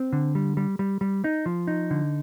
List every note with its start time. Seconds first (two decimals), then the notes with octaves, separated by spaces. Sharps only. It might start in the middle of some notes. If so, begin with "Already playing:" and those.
Already playing: C4
0.13 D3
0.35 G3
0.57 G3
0.79 G3
1.01 G3
1.24 D#4
1.46 F3
1.67 D#4
1.91 D3